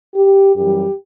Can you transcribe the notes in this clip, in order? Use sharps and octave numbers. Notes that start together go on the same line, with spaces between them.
G4
F#2 E3 G3 G4